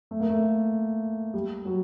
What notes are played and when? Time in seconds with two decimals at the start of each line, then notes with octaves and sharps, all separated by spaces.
0.11 A3
0.20 A#3
0.30 A3
1.34 G3
1.65 F#3